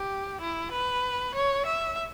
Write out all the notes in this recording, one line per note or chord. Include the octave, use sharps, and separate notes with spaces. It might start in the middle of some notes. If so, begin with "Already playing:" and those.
Already playing: G4
E4
B4
C#5
E5